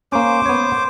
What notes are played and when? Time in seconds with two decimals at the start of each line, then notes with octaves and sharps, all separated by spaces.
0.12 A#3 C#4 C5 D6
0.46 B3 C#5